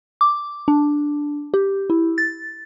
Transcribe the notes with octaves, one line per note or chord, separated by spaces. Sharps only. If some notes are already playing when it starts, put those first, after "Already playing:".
D6
D4
G4
E4
A6